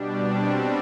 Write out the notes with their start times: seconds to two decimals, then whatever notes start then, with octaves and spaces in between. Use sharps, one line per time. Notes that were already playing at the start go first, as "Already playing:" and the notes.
Already playing: B2 G3 D4
0.25 C4